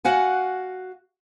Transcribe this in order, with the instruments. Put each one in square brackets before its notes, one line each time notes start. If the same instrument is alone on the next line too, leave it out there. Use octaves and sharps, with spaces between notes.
[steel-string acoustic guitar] F#4 F5 F#5 G#5